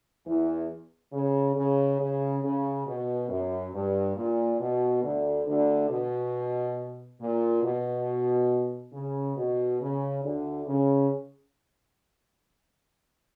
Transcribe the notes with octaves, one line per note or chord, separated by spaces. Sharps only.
E2 E3
C#3
C#3
C#3
C#3
B2
F#2
G2
A#2
B2
D2 D3
D2 D3
B2
A#2
B2
C#3
B2
C#3
D2 D3
C#3